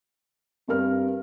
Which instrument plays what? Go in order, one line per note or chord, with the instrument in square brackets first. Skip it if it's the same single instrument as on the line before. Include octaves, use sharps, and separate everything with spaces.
[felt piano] G2 A#4 F6 [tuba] C4